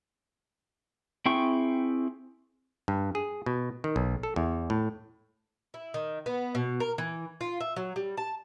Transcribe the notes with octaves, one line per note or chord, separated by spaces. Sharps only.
C4 E4 G#4 G5 C#6
G2
G#4
B2
D#3
B1
A4
E2
A2
E4
D#3
B3
B2
A#4
E3
F4
E5
F#3
G3
A5